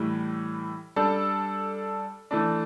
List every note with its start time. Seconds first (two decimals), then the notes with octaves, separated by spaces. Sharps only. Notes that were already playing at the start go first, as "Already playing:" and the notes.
Already playing: A2 E3 G3
0.96 G3 D4 A4
2.31 E3 A3 D4